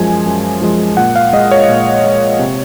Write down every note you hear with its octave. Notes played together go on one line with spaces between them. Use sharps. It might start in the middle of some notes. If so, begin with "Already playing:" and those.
Already playing: F#2 F3 G#3 G#5
F#2
F3 G#3
A#2 F#5
F5
G#3 D#5
C#5
A#2
G#3
C3